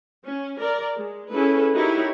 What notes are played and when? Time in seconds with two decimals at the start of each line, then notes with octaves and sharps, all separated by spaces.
0.23 C#4
0.59 A#4 D5
0.97 G#3
1.31 C#4 E4 G#4 A4 B4
1.73 D#4 E4 F#4 G4 A#4 C#5